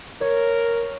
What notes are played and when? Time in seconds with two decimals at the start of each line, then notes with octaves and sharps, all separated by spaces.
0.21 A#4 C#5